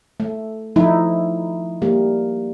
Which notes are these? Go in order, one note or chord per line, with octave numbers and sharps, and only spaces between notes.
A3
F3 A3 D#4 E4
G3 A#3